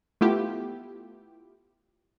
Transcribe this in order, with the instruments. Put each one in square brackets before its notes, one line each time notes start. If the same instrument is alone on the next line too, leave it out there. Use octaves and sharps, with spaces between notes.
[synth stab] A3 B3 E4 F4 G4